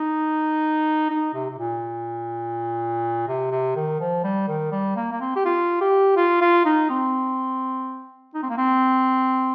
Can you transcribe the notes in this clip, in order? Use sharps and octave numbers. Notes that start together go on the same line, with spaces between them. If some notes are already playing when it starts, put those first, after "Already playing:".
Already playing: D#4
D#4
C3
C3
A#2
C3
C3
D#3
F3
G3
D#3
G3
A#3
A#3
C4
G4
F4
G4
F4
F4
D#4
C4
D#4
C4
A#3
C4